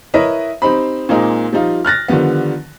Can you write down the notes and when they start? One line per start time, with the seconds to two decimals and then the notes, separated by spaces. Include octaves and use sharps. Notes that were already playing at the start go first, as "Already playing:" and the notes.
0.14 E4 A#4 B4 C#5 D#5 E5
0.62 C4 D#4 G4 C5 B5
1.09 A#2 G#3 A#3 C4 D#4 G#4
1.53 F3 G3 D#4 F4
1.85 F6 F#6 A6 A#6
2.08 D3 D#3 F3 G3 B3